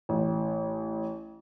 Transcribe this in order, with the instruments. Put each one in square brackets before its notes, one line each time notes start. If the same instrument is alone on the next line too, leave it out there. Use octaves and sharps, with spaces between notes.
[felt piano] A1